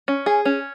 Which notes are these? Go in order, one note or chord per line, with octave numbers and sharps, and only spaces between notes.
C#4
G#4
C#4